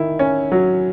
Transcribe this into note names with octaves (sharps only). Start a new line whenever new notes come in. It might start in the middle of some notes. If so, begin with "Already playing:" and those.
Already playing: D#3 E4
C#4
F#3